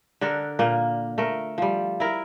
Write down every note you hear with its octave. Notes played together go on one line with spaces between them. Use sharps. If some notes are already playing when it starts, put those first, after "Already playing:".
D3 D4 A4 A#4
A#2 A#3
A3 A#4
F3 G3
E4 A#4